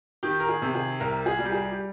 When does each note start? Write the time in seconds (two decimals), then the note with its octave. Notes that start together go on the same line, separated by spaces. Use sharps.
0.23 D#3 G4
0.40 A#4
0.49 G#4
0.62 C3
0.75 G#4
1.00 C2 A#4
1.26 G#4
1.39 G3
1.45 G4
1.52 G#4
1.72 G4